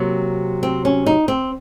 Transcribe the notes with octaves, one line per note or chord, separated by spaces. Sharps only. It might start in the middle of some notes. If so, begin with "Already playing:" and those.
Already playing: C3 F#3 A#3 C4
C4
C#4
D#4
C4